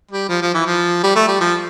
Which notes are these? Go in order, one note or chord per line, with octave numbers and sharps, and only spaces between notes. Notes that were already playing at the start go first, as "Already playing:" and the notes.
G3
F3
F3
E3
F3
G3
A3
G3
F3